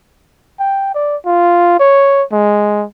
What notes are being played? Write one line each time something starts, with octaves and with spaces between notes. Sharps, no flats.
G5
D5
F4
C#5
G#3